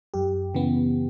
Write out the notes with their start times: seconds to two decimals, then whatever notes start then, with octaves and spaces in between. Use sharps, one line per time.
0.14 F#2 G4
0.54 C#3 E3 B3